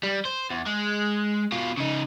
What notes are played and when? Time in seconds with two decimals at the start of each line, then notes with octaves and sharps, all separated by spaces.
0.03 G3
0.25 C5
0.50 E2
0.66 G#3
1.52 B2 F4
1.77 C#3 D#4